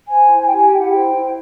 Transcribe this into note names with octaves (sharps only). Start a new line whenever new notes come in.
C5 G#5
E4
G#5
G5
G4 G#5
E4 G5
F#5
C5 G5
E4